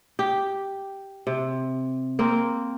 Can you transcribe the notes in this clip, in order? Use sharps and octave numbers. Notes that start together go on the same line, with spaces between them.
G4
C3
A#3 C4